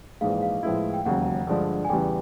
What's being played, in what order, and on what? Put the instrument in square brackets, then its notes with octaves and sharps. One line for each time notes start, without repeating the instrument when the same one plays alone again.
[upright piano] A#1 G#2 E3 G#3 [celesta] F5
[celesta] F5
[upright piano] A2 F3 G#3 B3 E4
[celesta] G5
[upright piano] E1 D#2 C#3 F#3 [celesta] F#5
[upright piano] G2 D3 F3 G#3
[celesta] G#5
[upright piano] E2 C#3 E3 G3 [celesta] G5